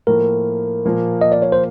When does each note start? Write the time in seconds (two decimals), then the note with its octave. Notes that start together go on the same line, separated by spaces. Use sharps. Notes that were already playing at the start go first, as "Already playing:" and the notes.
0.07 A2 F3 A#3 A#4
0.85 A#2 F3 A#3
1.21 D#5
1.32 D5
1.42 C#5
1.52 C5